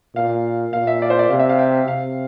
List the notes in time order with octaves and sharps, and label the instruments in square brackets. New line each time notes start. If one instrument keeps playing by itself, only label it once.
[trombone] A#2 [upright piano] F5
[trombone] A#2 [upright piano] F5
[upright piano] E5
D5
C5
D5
[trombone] C3 [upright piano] F5
[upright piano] E5
F5
G5
[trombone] C3 [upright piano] F5